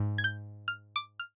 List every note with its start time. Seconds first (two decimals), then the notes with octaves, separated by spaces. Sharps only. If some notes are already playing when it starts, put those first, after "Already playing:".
Already playing: G#2
0.18 G#6
0.24 G6
0.68 F6
0.96 D6
1.19 F6